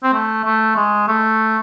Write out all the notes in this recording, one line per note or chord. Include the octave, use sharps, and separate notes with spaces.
C4
A3
A3
G#3
A3